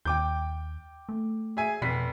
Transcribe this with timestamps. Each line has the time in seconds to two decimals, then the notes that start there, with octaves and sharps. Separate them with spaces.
0.05 D#2 G5 D6 G6
1.09 A3
1.57 G#4 E5 G#5
1.82 F1 B2 B6 C7